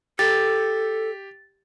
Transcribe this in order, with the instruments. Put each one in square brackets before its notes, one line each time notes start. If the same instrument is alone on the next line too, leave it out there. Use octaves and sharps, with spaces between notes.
[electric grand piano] G4 [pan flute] A4 [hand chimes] A6